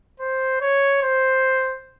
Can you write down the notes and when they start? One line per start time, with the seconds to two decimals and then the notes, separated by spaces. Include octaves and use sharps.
0.20 C5
0.61 C#5
1.02 C5